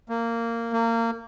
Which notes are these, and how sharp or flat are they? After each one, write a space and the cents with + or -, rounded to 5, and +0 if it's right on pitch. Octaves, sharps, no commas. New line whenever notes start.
A#3 -15
A#3 -25